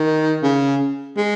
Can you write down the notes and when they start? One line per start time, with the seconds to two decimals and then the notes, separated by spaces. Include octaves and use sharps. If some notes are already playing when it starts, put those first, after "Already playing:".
Already playing: D#3
0.43 C#3
1.17 G#3